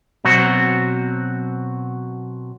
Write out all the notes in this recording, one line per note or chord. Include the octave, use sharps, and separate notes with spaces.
B2 F#3 C4 F#4